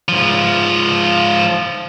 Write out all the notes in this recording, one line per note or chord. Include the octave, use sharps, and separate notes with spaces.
G#2 F3